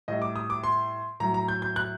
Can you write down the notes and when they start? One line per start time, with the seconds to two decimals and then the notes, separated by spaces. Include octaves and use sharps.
0.08 A2 G3 D#5
0.22 D6
0.36 D#6
0.50 D6
0.64 C6
1.20 A2 F#3 A#5
1.34 A#5
1.48 G6
1.62 G6
1.76 F#6